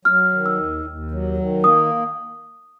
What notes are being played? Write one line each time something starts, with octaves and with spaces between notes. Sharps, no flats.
F#3 F6
D#3
E6
D#2
D#2
F#3
D#3
A#3 D#6